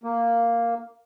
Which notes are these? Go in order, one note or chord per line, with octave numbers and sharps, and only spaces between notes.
A#3